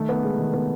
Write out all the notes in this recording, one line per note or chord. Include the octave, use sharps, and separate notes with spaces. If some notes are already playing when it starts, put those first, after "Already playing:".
Already playing: D#3 A3
B3
G#3
D#3
B3